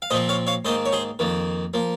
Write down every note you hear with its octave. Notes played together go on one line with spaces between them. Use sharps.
F5
A#2 F3 C4 C5 D#5
C#5 F5
C#5 F5
G#2 D#3 A#3 C5 D#5
C#5
G#4 C5
F2 D#3 A#3
F3 A#3